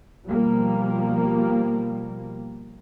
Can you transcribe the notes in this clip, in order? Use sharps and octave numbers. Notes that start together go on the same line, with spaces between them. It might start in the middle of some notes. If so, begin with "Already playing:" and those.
B2 F3 G3 A#3